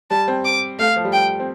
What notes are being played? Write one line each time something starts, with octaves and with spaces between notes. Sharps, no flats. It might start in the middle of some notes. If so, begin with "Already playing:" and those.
G3 A5
C4
D6
A3 F5
F3
G3
G5
C4